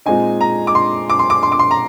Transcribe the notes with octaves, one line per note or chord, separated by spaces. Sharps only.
A#2 G#3 C4 D#4 G#5
A#5
D6
C6
D6
C6
D6
C6
D6
C6
A#5